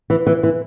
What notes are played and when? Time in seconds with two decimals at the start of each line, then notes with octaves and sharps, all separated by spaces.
0.10 E3
0.27 E3
0.43 E3